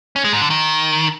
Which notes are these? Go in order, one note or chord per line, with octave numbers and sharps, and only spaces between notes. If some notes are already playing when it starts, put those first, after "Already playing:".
C#4
G#3
G#2
D3
D#3